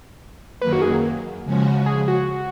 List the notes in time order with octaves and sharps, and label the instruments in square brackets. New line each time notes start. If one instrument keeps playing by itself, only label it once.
[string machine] F#2 D#3 F#3 A#3 [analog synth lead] B4
[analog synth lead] F#4
G#4
[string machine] C#3 F3 G#3 C#4 F#4
[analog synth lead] G#4
F#4